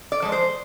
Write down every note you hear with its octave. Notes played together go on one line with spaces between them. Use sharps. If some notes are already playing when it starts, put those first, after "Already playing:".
D5
F3 G#3
C5